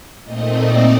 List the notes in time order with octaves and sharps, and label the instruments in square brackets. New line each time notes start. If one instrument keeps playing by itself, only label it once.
[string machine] A#2 A3 C4 D#4 D#5
D5